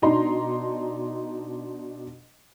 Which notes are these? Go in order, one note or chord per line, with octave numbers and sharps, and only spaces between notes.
B2 D4 D#4 A#5 C6